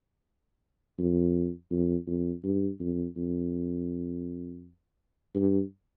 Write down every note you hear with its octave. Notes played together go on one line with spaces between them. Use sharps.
F2
F2
F2
G2
F2
F2
G2